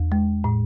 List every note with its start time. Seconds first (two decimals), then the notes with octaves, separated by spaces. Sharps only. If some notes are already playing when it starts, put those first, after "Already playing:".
Already playing: E2
0.12 G#3
0.44 A2